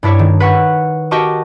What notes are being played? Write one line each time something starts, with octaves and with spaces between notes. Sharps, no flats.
G2 D4 E4 C#5 D5
D#3
B4 F#5 C#6
F#4 G4 A#4 D#5 A5 C#6